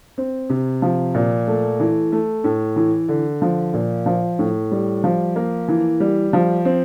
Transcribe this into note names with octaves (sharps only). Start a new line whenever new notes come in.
C4
C3
F3
A#2
A3
E3
A3
A2
E3
D3
F3
A#2
F3
A2
G3
F3
A#3
E3
G3
F3
C4